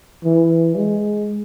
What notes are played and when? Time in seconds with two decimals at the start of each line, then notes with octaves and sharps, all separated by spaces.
0.24 E3
0.76 G#3